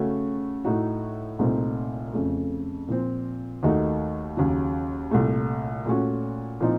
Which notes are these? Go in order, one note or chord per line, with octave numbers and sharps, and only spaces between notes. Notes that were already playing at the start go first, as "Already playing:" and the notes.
Already playing: C#3 A3 C#4 F#4
A2 A3 D#4 F#4
C2 A#2 A3 C4 D#4
F2 C#3 A3
A#2 F3 C4
D#2 D#3 A3 D#4 F#4
D#2 C#3 F#3
C2 A#2 A3
A#2 A3 C#4 F#4
A#2 F3 C4 D#4